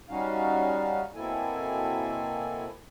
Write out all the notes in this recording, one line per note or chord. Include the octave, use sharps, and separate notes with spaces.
G3 C#4 D#4 F#4 F5
B2 A#3 C4 E4 A4 G#5